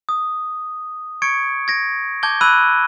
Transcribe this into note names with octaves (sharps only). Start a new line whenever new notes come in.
D#6
C#6 G#6 C#7 D7
G#6 A#6 D7
A5 D6 G6 G#6 G7
B5 E6 F#6 D#7